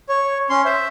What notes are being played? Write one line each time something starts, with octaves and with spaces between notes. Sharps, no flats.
C#5
C#4 C6
C5 E5